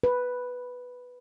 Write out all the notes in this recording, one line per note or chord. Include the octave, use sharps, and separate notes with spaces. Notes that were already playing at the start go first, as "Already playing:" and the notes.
B4